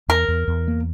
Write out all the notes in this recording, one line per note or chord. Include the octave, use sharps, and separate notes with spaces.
E2 A#4
E2
E2
A#3